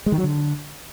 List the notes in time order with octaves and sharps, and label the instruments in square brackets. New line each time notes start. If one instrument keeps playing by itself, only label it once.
[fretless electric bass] G#3
D#3
F#3
D3